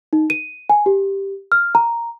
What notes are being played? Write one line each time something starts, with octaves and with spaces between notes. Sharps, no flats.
D#4
D#7
G#5
G4
F6
A#5